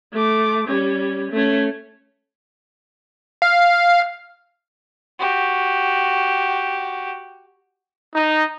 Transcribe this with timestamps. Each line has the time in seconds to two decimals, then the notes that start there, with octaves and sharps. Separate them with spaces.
0.13 A3 D6
0.67 G3 C#4
1.32 A3 C#4
3.42 F5
5.19 F#4 G4
8.14 D#4